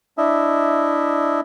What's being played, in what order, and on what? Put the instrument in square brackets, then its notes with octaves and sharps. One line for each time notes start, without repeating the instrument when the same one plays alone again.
[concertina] D4 E4 D#5 E5